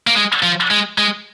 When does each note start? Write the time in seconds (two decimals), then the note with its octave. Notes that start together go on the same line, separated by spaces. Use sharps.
0.07 A#3
0.15 G#3
0.43 F3
0.71 G#3
0.98 G#3